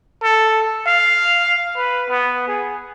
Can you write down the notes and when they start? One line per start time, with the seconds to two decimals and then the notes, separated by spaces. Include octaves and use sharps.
0.23 A4
0.87 F5
1.77 B4
2.09 B3
2.48 G#4